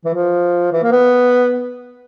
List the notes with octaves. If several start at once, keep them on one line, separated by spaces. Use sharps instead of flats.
E3
F3
E3
A#3
B3